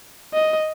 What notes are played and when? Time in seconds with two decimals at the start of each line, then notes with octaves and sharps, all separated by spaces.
0.34 D#5